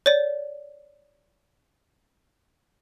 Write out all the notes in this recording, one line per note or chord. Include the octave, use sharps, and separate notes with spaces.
C#5 D5